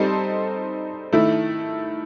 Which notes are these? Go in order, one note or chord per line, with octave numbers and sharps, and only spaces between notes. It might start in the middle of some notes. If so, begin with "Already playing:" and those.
Already playing: G3 C4 D#4 A4 C5
D#3 A3 E4